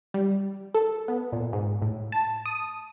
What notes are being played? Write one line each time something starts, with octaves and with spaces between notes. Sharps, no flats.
G3
A4
B3
A#2
G#2
A2
A5
D#6